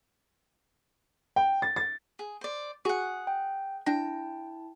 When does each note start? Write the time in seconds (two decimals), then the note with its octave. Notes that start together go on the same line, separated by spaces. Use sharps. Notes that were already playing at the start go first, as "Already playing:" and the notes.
1.36 G5
1.62 A6
1.76 A6
2.19 G#4
2.41 C5 D5
2.85 F#4 G#4 F#5 C#6
3.27 G5
3.86 D4 E4 G5 A5 A#6